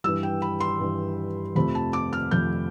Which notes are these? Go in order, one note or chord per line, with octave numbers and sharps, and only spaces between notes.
G2 E3 G3 E6
G5
B5
C6
G2 E3 G3
F2 C3 F3 A3 B5
A5
D6
F6
F2 C3 F3 A3 G6